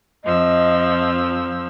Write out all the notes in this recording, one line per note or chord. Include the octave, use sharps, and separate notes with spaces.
F2 F3 D#5 E6